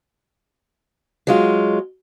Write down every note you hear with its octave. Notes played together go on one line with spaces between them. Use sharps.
F#3 G#3 F4